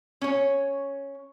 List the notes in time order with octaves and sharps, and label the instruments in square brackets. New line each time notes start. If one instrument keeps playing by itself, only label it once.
[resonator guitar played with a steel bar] C#4 C#5